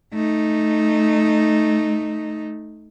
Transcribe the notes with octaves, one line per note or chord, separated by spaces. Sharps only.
A3 D#4